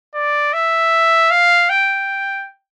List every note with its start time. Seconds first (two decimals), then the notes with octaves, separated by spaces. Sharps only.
0.15 D5
0.53 E5
1.31 F5
1.70 G5